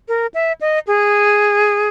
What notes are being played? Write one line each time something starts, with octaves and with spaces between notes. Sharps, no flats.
A#4
E5
D#5
G#4